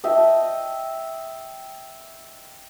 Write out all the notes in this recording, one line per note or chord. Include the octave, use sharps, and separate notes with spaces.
D#5 E5 G5 A5